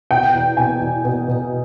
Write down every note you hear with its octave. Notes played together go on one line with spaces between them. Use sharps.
B2 G5
E2
B2 G#5
E2
B2
B2